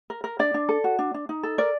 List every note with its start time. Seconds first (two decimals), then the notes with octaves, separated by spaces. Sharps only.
0.10 A#4
0.24 A#4
0.39 D4 D5
0.54 D4
0.69 A4
0.84 F#4
0.99 D4
1.14 D4
1.29 D#4
1.43 A4
1.58 A#4 D5